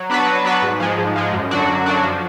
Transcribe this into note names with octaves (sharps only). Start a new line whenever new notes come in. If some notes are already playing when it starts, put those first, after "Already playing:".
Already playing: F#3
B3 D4 F#4 B4
F#3
B3 D4 F#4 B4
G#2
F3 G#3
G#2
F3 G#3
F#2
D3 F#3 D4 F#4
F#2
D3 F#3 D4 F#4
F3